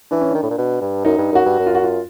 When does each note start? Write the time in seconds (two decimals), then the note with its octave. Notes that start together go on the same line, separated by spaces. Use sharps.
0.11 E3 D4
0.21 C#4
0.30 D#3 D4
0.43 A2
0.50 A#2
0.58 B2
0.81 G2
1.05 F#2 D#4
1.18 G2
1.32 F#2 F#4
1.46 G2
1.59 F#2
1.66 F4
1.75 F#4
1.83 F4